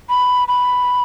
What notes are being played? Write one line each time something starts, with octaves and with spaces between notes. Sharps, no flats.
B5
B5